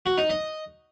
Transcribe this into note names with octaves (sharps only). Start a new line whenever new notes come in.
F#4
D#4
D#5